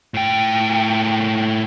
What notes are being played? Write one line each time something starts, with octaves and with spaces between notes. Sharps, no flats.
A2 G5